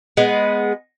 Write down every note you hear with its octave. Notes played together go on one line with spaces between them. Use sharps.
G#3 B3